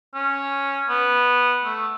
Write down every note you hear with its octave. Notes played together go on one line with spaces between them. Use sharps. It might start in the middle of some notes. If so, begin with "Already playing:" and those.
C#4
B3
A3